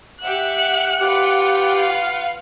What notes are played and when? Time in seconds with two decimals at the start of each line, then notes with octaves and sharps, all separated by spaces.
0.23 G4 E5 F#5 F#6
1.01 F4 G4 B4
1.73 F5